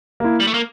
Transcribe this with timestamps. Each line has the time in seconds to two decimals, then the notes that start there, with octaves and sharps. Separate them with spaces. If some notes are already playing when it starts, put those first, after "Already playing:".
0.20 A#3 E4
0.40 G3
0.47 A3
0.54 A#3